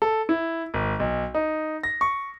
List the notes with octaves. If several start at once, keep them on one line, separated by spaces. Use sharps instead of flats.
A4
E4
G#1
B1
D#4
A#6
C#6